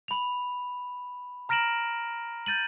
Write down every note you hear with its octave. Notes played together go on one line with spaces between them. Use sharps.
B5 F7
A#5 F6 A#6 D7 E7 F#7
G6 A6 D#7 F#7